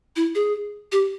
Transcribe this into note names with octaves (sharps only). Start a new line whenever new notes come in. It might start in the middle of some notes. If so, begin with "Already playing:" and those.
E4
G#4
G4